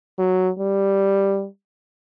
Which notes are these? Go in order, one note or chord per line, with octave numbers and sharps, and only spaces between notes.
F#3
G3